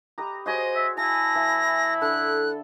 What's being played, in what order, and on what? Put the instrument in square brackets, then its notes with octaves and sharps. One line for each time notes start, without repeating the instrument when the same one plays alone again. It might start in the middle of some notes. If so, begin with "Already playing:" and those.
[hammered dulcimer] G4 B4 D#5 [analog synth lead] A#5
[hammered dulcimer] F#4 G#4 C#5 [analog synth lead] C5 [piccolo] D#5
[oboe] E5
[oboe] E4 [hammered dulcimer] F5 A5 [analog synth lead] G#5 [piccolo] A#6
[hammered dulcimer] E3
[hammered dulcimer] D3 [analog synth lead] A4 [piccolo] F#6